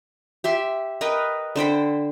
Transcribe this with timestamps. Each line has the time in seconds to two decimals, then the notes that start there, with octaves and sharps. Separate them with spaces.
0.44 G4 E5 C6
1.01 A#4 B4 D#5 G5
1.56 D3 C5 G5 B5